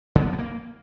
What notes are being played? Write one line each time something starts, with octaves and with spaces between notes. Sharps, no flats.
C#3
B3
F3
B3
A#3